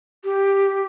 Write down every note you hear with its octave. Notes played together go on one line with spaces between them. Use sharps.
G4